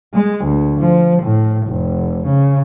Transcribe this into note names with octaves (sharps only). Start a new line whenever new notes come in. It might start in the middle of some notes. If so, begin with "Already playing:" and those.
G#3
D2
F3
A2
F1
C#3